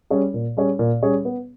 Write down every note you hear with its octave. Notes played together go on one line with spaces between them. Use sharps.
G3 C#4 G#4 C#5
A#2
G3 C#4 G#4 C#5
A#2
G3 C#4 G#4 C#5
B3